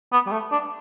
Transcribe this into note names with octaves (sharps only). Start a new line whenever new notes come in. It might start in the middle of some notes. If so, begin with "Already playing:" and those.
B3
G3
A3
D4